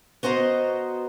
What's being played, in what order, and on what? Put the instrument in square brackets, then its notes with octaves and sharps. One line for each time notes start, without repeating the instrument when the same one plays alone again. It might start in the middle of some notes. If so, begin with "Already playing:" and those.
[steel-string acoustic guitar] B3 F#4 C5 D#5 A#5